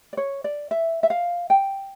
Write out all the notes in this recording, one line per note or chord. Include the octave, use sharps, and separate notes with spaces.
D5
C#5
D5
E5
E5
F5
G5